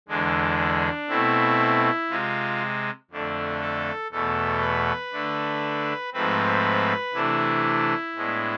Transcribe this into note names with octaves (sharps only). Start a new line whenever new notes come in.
E2 D3 G#3 D4
B2 A3 C4 E4
C3 G#3 C4 F4
F2 D3 A3 D4
A4
E2 B2 A3 A4
B4
D3 A3 D4
G#2 F3 A3 C4 B4
C3 E3 A3 D4 E4
A2 G#3 B3 D4